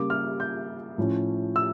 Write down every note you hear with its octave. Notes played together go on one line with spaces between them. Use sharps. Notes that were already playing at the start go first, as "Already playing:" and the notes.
Already playing: C#3 G3 A#3 D6
F6
G6
A2 F3 C#4
E6